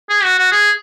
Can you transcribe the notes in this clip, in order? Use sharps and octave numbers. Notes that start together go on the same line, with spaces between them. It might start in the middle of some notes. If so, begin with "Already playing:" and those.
G#4
F#4
F#4
G#4